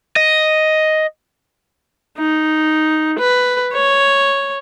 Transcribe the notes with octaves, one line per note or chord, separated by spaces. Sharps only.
D#5
D#4
B4
C#5